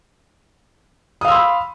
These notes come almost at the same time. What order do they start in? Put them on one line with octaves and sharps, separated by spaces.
D#6 F5 E6 C6 B5